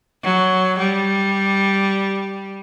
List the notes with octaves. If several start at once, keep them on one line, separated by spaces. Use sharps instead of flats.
F#3
G3